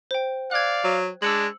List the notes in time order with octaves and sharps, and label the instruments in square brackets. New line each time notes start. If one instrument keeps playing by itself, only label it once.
[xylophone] C5 G5
[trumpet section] D5 F5 [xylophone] F#6 G#6
[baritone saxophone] F#3
[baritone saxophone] G#3 [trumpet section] D4 [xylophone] E6 C#7 F#7